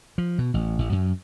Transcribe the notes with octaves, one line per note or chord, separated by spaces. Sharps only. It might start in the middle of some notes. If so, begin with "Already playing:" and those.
F3
B2
A1
A1
F#2